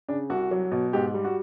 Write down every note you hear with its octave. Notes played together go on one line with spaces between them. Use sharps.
C#3 D4
C2 F#4
F#3
B2
G#2 G4
G3
F#4